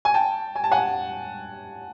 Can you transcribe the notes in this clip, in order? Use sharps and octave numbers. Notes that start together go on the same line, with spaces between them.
G#5
G5 A5
G#5
A5
F#5 G#5